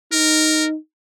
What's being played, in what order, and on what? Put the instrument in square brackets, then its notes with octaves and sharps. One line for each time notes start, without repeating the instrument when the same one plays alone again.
[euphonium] D#4 [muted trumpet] A#4